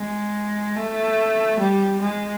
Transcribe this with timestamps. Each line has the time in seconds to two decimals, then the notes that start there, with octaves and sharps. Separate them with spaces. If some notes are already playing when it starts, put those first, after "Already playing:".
Already playing: G#3
0.76 A3
1.59 G3
2.01 G#3